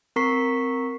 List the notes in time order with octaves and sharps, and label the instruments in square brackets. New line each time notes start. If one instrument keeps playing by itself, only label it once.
[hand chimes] C4 A#4 A#5 C#6 B6 C7